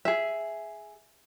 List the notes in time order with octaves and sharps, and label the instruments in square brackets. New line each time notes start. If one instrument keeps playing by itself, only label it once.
[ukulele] G#4 E5